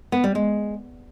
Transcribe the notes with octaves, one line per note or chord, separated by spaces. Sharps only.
B3
G3
G#3